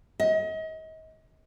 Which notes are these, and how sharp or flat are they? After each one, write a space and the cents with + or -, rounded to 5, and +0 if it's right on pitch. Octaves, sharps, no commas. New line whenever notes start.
D#5 +35